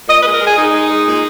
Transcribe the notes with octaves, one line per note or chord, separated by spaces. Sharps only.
A#2 D#5
B4
G#3
A#4
G#3 G#4
G#3 D#4
G#3
G#3
A#2